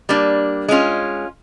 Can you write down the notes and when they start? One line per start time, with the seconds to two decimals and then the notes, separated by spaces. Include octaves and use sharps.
0.09 G3 A#3 D4
0.68 G#3 C#4 F4